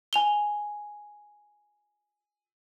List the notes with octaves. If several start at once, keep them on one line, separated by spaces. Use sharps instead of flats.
G#5 F7 G7